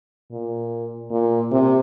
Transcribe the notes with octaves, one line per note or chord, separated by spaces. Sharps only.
A#2
A#2
C3